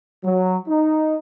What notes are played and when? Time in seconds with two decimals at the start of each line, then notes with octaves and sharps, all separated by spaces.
0.24 F#3
0.69 D#4